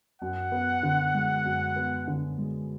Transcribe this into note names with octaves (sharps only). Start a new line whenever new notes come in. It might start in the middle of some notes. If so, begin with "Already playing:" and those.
F#2 F#5
B3
D3
G#3
F#2
B3
D3
G#3